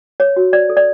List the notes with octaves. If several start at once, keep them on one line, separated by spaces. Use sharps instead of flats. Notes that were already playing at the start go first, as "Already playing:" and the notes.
C#5
F#4
C#5 D5
A4
D5